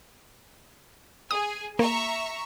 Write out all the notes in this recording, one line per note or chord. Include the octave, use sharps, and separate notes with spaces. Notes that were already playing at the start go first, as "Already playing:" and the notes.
G#4 D#6
A#3 E5 A#5 C#6